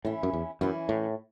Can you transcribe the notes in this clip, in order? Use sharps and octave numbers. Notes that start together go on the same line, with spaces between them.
A2 E3 C#4 E4
F#2
E2
F#2 E3 C#4 E4
A2